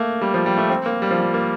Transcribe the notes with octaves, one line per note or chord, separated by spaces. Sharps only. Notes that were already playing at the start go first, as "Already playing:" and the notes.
Already playing: A3 A#3
G3
F3
G3
A3
C4
A#3
G3
F3
G3
A#3